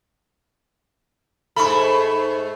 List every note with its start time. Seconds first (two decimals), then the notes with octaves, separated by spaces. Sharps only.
1.56 G#2 A3 B5 C#6